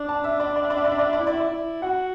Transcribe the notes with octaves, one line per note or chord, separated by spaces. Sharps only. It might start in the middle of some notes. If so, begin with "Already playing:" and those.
Already playing: D4
A5
E5
D5
D5
E5
D5
E5
D5
E5
D5
E5
D5
E4 E5
D5
E5
D5
E4
F#4 F#5